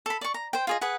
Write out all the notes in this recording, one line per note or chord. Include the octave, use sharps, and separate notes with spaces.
A4 B5
D5 C#6
A#5
C5 G5
F4 G#4 D#5
G#4 B4 F#5